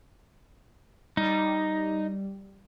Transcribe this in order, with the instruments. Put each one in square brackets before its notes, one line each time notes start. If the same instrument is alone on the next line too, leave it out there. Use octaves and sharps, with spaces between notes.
[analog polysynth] G3 [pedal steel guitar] D#4